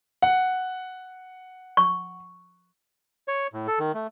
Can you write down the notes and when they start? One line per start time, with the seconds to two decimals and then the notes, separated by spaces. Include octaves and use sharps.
0.22 F#5
1.77 C#6
3.28 C#5
3.53 A2
3.67 A4
3.79 D#3
3.94 A3